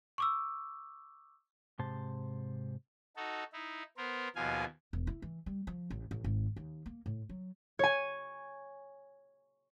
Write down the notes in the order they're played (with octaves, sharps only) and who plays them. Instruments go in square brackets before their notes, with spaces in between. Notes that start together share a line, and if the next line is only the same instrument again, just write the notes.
[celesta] C#6 D6 E6
[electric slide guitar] G#2 C3 C5 A5
[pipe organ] D#4 F#4 A4
D#4 E4
B3 A#4 C5
D#2 B2 F3 F5 G#5
[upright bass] E1
E4
E3
G3
F3
A1
A1
G#1
D#2
A#3
A2
F#3
[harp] C#5 G#5